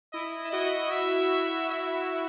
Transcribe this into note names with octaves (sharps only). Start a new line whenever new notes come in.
E4 D#5
E4
F#4 D#5
E5
E5